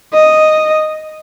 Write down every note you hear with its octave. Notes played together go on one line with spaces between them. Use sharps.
D#5